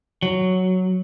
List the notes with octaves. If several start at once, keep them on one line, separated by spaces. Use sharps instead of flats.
F#3